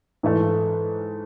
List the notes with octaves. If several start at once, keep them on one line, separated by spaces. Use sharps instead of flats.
G#2 E3 A3